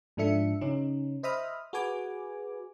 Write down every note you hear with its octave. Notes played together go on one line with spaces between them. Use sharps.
G#2 F3 D4 A4 E5 C#7
C#3 C#4 D#4
C5 D#5 E5 B5 D#6 F6
F#4 G#4 B4 G#5 D6